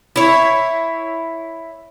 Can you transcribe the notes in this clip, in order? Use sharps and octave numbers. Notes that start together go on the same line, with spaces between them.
E4 C#5